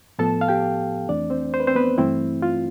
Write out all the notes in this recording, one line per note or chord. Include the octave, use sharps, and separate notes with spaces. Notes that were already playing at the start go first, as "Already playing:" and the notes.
A2 F3 B3 A4 A5
F5
G4 G5
F2 E3 A3 C4 D4 D5
C4 C5
C5
B4
C4 C5
B3 B4
G2 E3 A3 C4 E4
F4